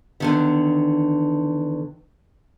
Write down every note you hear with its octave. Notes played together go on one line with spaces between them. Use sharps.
E2 D3 D#3